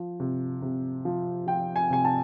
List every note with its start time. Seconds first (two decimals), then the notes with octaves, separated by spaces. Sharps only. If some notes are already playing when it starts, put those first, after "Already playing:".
Already playing: F3
0.20 C3
0.62 C3
1.05 F3
1.47 F3 G5
1.76 G#5
1.90 C3 G#5
2.05 A5